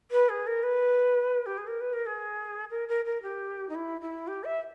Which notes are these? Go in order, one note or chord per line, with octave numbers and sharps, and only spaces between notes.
B4
G#4
A#4
B4
G4
G#4
A#4
B4
A#4
G#4
A#4
A#4
A#4
G4
D#4
E4
E4
G4
E5